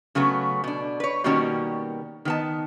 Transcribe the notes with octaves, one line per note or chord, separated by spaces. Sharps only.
C#3 F#3 A3 B3
B2 D4
B4 C#5
B2 D#3 G3 A#3 C#4 F#4
D#3 B3 A5